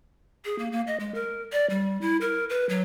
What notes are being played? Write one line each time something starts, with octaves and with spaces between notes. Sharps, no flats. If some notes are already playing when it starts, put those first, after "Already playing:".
G#4
A#3
A#3
D#5
G#3
A#4
D5
G3
E4
A#4
B4
F#3